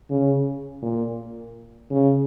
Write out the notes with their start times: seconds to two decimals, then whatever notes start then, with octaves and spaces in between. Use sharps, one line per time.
0.10 C#3
0.82 A#2
1.90 C#3